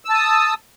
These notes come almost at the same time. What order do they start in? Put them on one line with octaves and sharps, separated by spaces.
E6 A5 D#6